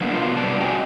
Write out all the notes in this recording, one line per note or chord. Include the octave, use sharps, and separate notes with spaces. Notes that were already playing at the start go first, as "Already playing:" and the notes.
F#3 A#3 B3 D4
B2 B3 F4
F#2 C3 G3 D5 A5
C#4 F#4 D#5 G5 G#5